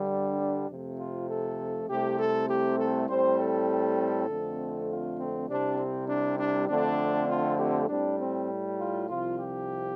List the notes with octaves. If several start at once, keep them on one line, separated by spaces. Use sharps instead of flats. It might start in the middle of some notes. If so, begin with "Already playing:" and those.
Already playing: G2 D3 G3
D4
D4
F2 C3 F3 A3
F4
A4
C2 C3 A3 C4 G4
A4
G4
A4
A2 G3 C4 C5
A4
F2 D3 A3 C4
F4
C4
C2 C3 G3 C4 D4
C4
D4
D4
F2 D3 A3 C4 D4
F4
G4
A2 G3 C4 D4
C4
F4
C2 C3 F3 F4
G4